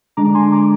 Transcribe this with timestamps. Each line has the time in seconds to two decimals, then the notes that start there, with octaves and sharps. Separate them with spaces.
0.17 D3 G#3 D4 A#5 D6
0.35 G#5 C6
0.52 A#5 D6